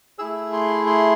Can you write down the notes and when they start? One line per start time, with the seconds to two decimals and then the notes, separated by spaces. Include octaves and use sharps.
0.19 A3 E4 G#4 E6
0.53 C6
0.87 C6